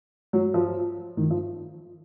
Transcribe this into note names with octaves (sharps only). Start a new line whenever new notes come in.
F#3
F3
D#3
F3